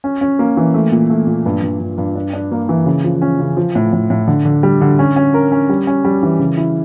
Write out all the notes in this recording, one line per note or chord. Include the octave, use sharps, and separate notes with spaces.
C#4
C#4
A#3
E3
A3
A#2
A3
A#2
G2
G2
G2
G2
D4
D4
A#3
E3
C#3
F3
C#4
C#3
F3
A2
A2
A2
D3
D3
G3
D3
C#4
C#4
A#4
C#4
G3
C#4
G3
E3
C#3
E4